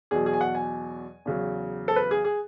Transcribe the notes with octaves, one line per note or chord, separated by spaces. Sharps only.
E2 B2 F#3 G#4
G#4
G#5
F#5
G#5
E2 C#3 F#3
A4
B4
G#4
G#4